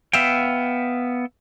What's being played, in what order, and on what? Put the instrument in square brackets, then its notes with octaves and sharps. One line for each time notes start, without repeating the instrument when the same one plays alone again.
[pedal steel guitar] B3 E5 F5 G5